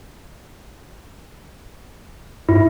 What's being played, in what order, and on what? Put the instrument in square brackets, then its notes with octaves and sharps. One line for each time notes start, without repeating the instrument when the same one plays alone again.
[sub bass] G#2 [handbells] E4